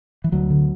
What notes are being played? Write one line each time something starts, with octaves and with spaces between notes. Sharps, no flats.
E3
D2 F#3
D3